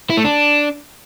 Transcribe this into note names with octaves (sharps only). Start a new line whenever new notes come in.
E4
A3
D4